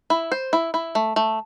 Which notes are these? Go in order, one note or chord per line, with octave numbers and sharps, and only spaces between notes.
E4
C5
E4
E4
A3
A3